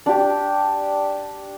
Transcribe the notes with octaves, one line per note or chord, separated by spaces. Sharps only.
D4 G4